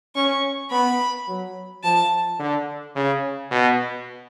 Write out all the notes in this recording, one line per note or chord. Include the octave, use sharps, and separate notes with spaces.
C#4 C#6
B3 B5
F#3
F3 A5
D3
C#3
B2